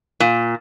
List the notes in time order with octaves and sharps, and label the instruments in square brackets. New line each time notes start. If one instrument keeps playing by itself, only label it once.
[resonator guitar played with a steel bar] A#2